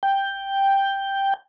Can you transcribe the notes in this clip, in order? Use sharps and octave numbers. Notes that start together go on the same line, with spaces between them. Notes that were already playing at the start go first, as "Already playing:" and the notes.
G5